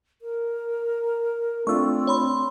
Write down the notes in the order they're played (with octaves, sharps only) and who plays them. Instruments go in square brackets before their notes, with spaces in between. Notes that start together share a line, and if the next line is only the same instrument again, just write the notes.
[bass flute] A#4
[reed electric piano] A3 D4 F4 [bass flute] C4 [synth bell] C#6 E6
[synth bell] C#5 B5 C6